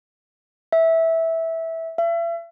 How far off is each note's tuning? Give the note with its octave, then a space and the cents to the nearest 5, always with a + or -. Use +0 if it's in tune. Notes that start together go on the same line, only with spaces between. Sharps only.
E5 -10
E5 +40